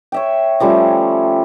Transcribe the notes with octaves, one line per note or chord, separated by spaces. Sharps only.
C#5 E5 G5
F3 G3 A3 C#4